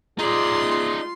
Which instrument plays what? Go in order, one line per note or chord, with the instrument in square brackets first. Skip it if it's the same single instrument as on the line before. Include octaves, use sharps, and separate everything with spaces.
[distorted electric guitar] D#4 D5 [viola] F4 C6 [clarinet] G#4